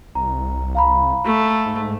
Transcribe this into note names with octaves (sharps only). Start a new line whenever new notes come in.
C2 A#5
F5 A#5 B5
A3
G#2